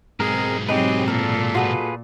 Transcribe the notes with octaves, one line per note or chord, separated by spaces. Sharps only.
B1 G#2 G#3 C4 G#4 A#4
F#3 C4 D#4 G4 G#4 B4 C#5
A#2 A4 A#4
F4 F#4 G#4 A4 B4